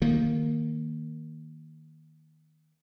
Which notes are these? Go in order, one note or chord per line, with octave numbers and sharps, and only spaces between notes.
D#3 A#3